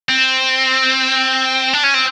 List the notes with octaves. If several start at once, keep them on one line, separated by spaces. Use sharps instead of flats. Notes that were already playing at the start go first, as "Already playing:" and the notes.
C4
D4
C#4
C4